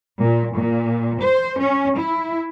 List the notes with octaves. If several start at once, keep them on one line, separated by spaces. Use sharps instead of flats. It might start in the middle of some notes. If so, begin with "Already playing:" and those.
A#2
A#2
C5
C#4
E4